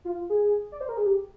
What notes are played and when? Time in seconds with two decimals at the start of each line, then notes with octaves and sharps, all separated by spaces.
0.05 F4
0.30 G#4
0.72 D5
0.81 C5
0.89 A#4
0.97 G#4
1.06 G4